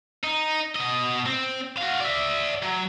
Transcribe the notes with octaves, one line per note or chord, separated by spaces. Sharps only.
D#4
B2 D#5
C4
F#4 F5
D5 E5
F#3